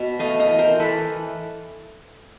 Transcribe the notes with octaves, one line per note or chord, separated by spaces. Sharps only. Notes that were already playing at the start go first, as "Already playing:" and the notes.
Already playing: B2
A3 D#5 F5
D#5 F5
E3
A#4 C5
E3
A4 B4
E3